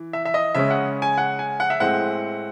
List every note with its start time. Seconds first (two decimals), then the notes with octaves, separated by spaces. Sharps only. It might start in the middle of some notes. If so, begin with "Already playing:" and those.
Already playing: E3
0.13 E5
0.25 E5
0.34 D#5
0.55 C#3 G#3 C#4 E5
0.70 F#5
1.02 G#5
1.18 F#5
1.39 G#5
1.60 F#5
1.70 E5
1.80 A2 G#3 C4 F#5